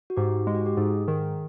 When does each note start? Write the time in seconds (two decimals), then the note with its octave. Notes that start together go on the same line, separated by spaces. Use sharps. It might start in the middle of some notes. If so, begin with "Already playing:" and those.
0.10 F#4
0.17 G#2 G4
0.47 G#3
0.55 F#4
0.66 G4
0.77 G#2 G#4
1.08 D#3